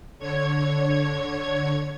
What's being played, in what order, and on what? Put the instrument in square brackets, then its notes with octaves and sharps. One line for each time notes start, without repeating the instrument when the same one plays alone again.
[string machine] D3 C#5 G#6